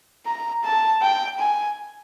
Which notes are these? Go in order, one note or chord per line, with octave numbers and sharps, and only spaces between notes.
A#5
A5
G5
G#5